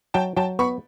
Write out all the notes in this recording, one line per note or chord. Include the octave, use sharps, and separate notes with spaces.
F#3 G5 A5
F#3 G5 A5
B3 B5 C#6